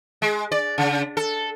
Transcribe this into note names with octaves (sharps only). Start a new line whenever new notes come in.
G#3
D5
C#3
A4